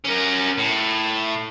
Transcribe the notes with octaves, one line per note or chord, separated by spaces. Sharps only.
C#4 A#4
A2